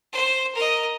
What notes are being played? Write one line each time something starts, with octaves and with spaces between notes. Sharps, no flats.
C5
A#4 D#5